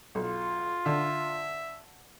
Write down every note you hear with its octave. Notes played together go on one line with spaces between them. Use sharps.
B1 F4
D3 E5